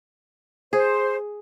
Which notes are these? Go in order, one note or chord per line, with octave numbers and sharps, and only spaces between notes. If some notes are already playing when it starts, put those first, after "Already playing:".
G#4 C5